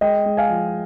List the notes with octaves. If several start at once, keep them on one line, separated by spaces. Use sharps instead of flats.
G#3 D#5 G5
G#3
F5 G#5
F3